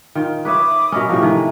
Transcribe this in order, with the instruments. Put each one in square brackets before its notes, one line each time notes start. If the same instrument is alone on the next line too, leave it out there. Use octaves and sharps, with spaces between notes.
[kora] D#3 F4
[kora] B4 C#5 E5 [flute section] B5 D6 D#6
[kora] B2 C#4 [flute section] A#4 D#5 E5
[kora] A2 C3 F3 [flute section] G5 C#6
[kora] D#3 E3 A3 [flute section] G#5